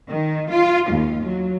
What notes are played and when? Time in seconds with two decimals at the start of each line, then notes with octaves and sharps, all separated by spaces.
0.10 D#3
0.50 F4
0.92 D#2
1.25 F#3